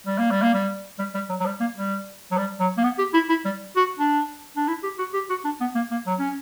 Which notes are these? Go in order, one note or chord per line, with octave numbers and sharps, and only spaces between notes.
G3
A#3
G3
A#3
G3
G3
G3
F#3
F#3
G3
A#3
G3
F#3
G3
F#3
A#3
B3
G4
E4
E4
G3
F#4
D4
D4
E4
G4
F#4
G4
F#4
D4
B3
A#3
A#3
F#3
C#4